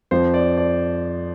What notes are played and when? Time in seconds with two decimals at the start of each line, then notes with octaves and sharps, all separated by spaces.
0.11 F2 F3 C5
0.34 D5
0.58 D5